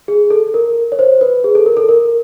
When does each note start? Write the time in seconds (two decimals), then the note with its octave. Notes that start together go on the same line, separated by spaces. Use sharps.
0.08 G#4
0.30 A4
0.54 A#4
0.92 C#5
0.99 C5
1.21 B4
1.44 G#4
1.55 A4
1.66 A#4
1.77 A4
1.89 A#4